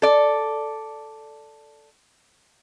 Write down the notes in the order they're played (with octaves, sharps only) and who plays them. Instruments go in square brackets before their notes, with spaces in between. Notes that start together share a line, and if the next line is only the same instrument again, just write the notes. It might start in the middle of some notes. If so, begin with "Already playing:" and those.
[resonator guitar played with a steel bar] A4 D5